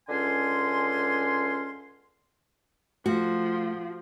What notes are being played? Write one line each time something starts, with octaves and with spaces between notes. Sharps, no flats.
C#2 D3 C#4 G#5 C6
F3 A3 F#4